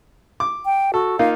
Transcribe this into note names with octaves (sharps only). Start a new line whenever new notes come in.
D6
G5
F#4 A4
A#3 D#4 F4 F5